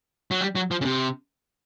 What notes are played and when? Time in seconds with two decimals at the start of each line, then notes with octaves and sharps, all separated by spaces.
0.31 F#3
0.41 G3
0.55 F#3
0.71 F3
0.81 C#3
0.85 C3